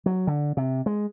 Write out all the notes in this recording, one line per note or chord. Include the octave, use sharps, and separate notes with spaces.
F#3
D3
C3
G#3